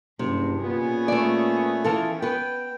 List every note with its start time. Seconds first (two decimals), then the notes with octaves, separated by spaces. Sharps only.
0.19 F#1 G2 C3
0.63 A#2 B3 C#4 G#4
1.08 A3 D5
1.84 E3 F4 A4
2.22 B3 B4 G5